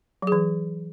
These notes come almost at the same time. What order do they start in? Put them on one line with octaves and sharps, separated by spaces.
F#3 G#4 E3